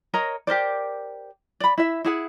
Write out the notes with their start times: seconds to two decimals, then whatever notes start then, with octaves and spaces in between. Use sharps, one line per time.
0.14 A#4 C#5 D#5 A#5
0.47 G4 A#4 C5 D5
1.60 D5 B5
1.78 E4 E5
2.05 E4 G#4 F#5